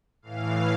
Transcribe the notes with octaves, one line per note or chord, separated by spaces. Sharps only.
A2 E3 F5